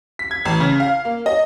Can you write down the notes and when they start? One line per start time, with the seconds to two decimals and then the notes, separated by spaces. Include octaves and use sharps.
0.19 B6
0.31 G#6
0.45 A1
0.60 C#3
0.80 F5
1.05 A#3
1.26 D#5